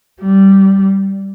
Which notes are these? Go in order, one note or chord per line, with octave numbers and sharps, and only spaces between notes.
G3